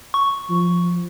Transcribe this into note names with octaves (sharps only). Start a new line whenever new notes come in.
C#6
F3